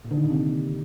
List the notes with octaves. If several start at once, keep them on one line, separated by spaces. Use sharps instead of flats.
A#2
D3
D#3
A#2
C3